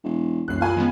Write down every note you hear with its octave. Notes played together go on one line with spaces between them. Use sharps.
E1
E1 C2 F#2 F#6 C7
A#2 F5 G#5 B5
C#2 D#3 G#3 B3